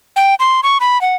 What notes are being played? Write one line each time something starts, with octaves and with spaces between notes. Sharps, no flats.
G5
C6
C#6
B5
F#5